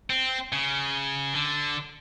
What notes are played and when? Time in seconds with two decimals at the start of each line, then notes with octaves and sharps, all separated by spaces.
0.10 C4
0.52 C#3
1.34 D3